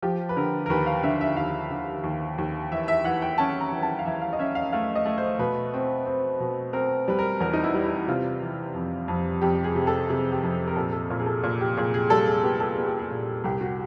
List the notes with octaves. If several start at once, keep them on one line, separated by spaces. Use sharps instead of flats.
F3 G4
B4
D3 A#4
A#4
D#2 B4
F5
D3 E5
E5
D#2 F5
D3
D#2
D#2
E3 E5
E5
E3 F#5
G5
C#4 A5
A#5
E3
A5
F5
E3 E5
F5
D#5
C#4 E5
F5
A3 F5
D#5
A3
C5
B2 B4
C4
C4
B2
C4 A#4
G3 B4
A#4
E2 A#4
D#4
E4
G3
E4
C3 F4
E3
F2
F2
F2 G4
G#4
C3
A4
C3 G#4
G4
F2
A#4
A#2 A4
A4
A#2 A#4
G#4
A4
A#2
G4
A#2 G#4
G#4
G3 A4
G#4
B3 G4
A4
B3 G#4
G4
G#4
A#2
C2 G4
F#4